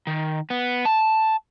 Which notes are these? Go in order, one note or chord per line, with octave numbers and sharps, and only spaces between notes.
D#3
B3
A5